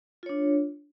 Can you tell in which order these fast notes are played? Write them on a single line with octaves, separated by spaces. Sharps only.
F4 C#5 D4